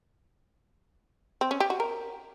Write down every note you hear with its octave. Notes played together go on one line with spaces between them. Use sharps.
C4
C#4
G4
F#4
A#4